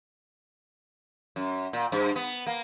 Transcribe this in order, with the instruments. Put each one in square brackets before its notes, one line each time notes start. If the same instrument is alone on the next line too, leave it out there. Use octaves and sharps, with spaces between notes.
[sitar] F#2
A#2
G2
B3
A#3